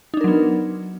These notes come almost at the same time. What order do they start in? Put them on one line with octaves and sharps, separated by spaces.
D#4 D4 A#4 F#3 B3